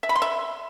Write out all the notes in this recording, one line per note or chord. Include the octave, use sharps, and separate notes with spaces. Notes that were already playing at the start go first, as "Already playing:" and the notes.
E5
B5
C6
E5